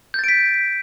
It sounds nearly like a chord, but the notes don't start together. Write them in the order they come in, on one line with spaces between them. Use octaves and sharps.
G6 A6 D7 B6